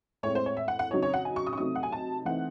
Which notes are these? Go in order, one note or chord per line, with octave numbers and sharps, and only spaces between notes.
A2 G#3 C4 C#5
C5
C#5
E5
F#5
F#5
C#3 F#3 C4 D#4 C#5
C#5
F#5
G#5
C#6
D#6
C#6
C3 F#3 A3 C4 D#4 D#6
F#5
G#5
A5
E3 A3 C4 D#4 F#5